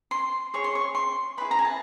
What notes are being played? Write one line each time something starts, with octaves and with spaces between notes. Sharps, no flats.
C6
G#4 C#5 C#6
C6
C#6
C6
E4 G#4 B4 D5 B5
A#5
G#5
A5